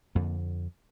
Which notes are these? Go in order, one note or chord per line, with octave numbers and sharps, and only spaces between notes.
F2 D3 A#3